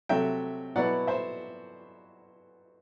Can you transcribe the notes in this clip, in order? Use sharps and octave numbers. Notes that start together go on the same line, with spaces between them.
C3 F#3 A3 E5 G5
B2 F#3 B3 E4 D5 F#5
C5 E5